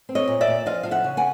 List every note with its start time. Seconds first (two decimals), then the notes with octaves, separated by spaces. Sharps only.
0.09 C4
0.15 C#5 D#5
0.28 A#2
0.41 D5 E5
0.48 A#2
0.66 F3 D#5 F5
0.83 F3 F5
0.91 E5 F#5
1.04 C#3
1.17 F#5 G#5